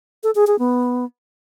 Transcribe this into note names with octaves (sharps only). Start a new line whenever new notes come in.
A4
G#4
G#4
B3